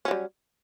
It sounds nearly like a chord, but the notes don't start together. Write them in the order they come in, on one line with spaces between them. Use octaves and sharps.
C#4 F#3 G3